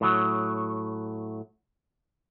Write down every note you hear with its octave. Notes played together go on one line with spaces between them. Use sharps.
A2 F#3